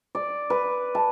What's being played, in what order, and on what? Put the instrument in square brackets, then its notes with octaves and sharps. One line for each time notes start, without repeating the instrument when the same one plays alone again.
[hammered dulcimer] D5
B4
A5